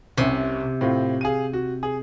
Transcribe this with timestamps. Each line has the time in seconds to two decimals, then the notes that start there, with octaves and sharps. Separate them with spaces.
0.18 C2 C3 C#4
0.81 A2 C4 F4
1.21 G#4 F5 D#7
1.53 F#4
1.83 G#4